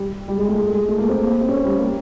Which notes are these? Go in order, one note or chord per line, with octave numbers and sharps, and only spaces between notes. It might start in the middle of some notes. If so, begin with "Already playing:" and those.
Already playing: G3
G3
G#3
A3
G#3
G#3
A3
A#3
C4
C4
C#4
G3
A#3